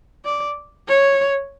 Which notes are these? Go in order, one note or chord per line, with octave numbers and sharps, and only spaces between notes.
D5
C#5